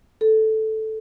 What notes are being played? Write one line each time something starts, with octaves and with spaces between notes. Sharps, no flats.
A4